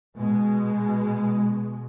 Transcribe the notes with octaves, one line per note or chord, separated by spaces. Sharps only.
B2 G#3